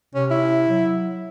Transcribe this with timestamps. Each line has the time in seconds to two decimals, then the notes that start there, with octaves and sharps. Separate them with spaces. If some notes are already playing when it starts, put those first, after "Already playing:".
0.15 C3 C#4
0.31 E4
0.69 F#3